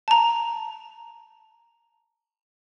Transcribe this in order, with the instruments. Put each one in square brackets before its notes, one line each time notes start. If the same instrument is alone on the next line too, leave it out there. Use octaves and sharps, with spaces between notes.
[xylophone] A5 A#5